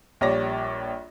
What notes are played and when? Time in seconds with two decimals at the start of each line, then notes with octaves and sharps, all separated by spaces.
0.21 A#1 G3 C#5 D5 A#6